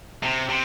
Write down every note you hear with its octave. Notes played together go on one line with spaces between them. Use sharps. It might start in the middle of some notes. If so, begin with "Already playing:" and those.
C3
C3